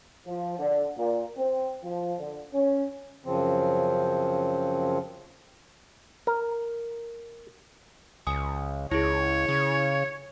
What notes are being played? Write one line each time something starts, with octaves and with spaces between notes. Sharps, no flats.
F3
D3
A#2
C4
F3
D3
C#4
F#2 C#3 F3 C4
A#4
C#2 G#5 D#6
C#2 E4 G#4 C#5
C#3